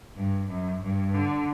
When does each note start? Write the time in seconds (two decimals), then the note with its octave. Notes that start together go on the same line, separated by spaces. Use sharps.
0.16 G2
0.48 F#2
0.82 G2
1.14 D3